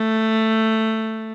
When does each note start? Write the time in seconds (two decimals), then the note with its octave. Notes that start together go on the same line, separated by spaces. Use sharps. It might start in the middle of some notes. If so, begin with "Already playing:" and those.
Already playing: A3